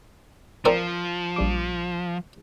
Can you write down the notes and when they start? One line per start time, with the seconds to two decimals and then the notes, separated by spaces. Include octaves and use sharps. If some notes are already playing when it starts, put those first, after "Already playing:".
0.65 F3 C4 A#4 D5
1.36 A#1 G3 D6